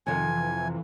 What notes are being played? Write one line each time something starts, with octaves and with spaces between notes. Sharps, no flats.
F2 C3 D#3 G#5
E3